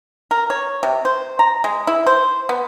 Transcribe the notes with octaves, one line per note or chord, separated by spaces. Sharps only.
A#4
C#5
C3
C5
A#5
G#3
E4
C5
B3